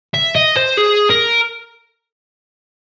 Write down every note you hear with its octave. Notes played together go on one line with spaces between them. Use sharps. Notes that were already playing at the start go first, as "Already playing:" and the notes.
E5
D#5
C5
G#4
A#4